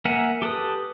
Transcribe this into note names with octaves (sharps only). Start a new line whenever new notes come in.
A#3 A#4 E5 F#5 G#5
G4 A4 B4 D#6